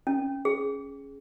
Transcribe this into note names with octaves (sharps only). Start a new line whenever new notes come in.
C#4
G#4